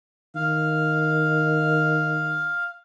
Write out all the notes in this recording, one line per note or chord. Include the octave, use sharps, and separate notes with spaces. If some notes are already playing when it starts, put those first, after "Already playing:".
D#3 F5